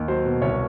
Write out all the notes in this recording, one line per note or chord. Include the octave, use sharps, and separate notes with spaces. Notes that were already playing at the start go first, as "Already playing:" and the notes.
Already playing: D#2
F#3 C5
B2
C2 C#5